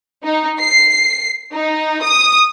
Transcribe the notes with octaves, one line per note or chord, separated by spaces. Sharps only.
D#4
C7
D#4
D#6